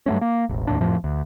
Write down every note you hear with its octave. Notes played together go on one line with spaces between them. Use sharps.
G2 F#3 A3 C#4
A#3
E1 A1
D#2 A2 D4
G1 F2 A2 F3
D2